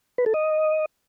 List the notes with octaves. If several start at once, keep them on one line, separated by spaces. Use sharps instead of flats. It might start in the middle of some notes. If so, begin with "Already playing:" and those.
B4
A4
D#5